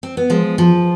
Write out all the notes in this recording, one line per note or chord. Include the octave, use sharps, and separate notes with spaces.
C4
B3
F3 G#3
F3